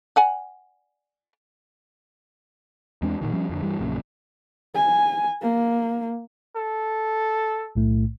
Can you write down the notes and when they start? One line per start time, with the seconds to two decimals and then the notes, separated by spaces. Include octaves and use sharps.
0.16 D5 F#5 G#5
3.02 E2 G#3 C4 D4
3.21 A1 A#2 D#3 E3
3.33 F3 G3 C#4
3.49 F2 D3
3.63 G2 E3 G3
3.79 A#1 F#2 A#2 C#3
4.75 G#5
5.42 A#3
6.56 A4
7.76 B1 A2 A3